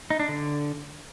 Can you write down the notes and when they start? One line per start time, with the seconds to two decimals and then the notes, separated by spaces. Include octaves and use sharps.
0.10 D#4
0.20 D4
0.29 D3